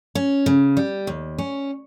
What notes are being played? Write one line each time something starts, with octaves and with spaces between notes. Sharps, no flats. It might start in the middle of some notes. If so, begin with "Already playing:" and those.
C#4
C#3
G3
D#2
C#4